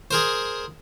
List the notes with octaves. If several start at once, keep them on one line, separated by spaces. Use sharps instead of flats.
G#4 A#4 C5